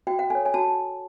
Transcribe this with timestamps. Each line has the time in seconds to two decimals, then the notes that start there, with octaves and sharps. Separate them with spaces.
0.07 F#4 G5
0.19 F#5
0.30 A4 C#5 G#5
0.45 G#5
0.54 F#4 A5